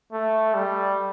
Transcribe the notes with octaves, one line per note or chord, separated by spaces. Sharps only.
A3
G3